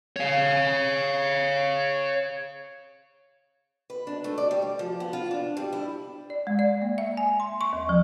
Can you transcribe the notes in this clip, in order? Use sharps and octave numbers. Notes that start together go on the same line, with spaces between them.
C#5 F5
B4
D4
A3
D5
G3
D5
F3
B3
F4
D4
G3
E4
D5
G#3
D5
A#3
E5
G#5
C6
C#6
D#2
F3